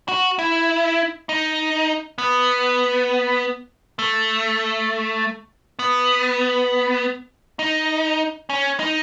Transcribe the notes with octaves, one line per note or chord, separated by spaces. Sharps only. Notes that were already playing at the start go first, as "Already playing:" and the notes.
F#4
E4
D#4
B3
A3
B3
D#4
C#4
D#4